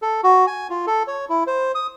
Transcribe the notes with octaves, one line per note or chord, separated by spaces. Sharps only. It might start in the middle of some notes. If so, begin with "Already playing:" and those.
A4
F#4
G#5
F4
A4
C#5
E4
C5
D#6